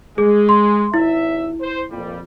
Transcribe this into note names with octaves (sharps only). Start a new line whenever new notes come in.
G#3 G#4
C6
G#1 E4 E5
C5
F2 A#2 G3